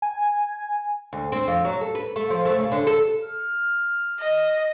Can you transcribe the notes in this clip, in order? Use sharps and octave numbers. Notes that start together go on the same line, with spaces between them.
G#5
D2
C4
F2
F#3
A4
B4
A3
F3
A3
C#3
D3
A4
F6
D#5